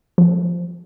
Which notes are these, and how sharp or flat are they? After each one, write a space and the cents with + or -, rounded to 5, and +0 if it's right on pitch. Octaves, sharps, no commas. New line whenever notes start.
F3 +5